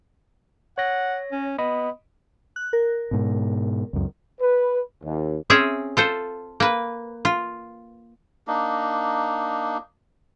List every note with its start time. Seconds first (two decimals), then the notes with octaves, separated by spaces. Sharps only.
0.78 C#5 F#5 A#6
1.32 C#4
1.58 B3 D#5 B5 D#6
2.56 F#6
2.73 A#4
3.11 G#2 B2
3.93 C#2 F#2
4.40 B4
5.03 D#2
5.50 C4 C#4 G#4 E5
5.97 F4 A4 C5
6.60 A#3 B4
7.25 F4
8.47 A#3 D4 D#4